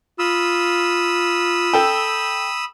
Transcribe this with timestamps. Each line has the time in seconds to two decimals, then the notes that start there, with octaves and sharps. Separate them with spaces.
0.19 F4 B5 D#6 E6
1.73 A4 G5